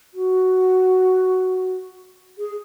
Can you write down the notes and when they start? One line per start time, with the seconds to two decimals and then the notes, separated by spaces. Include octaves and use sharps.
0.14 F#4
2.38 G#4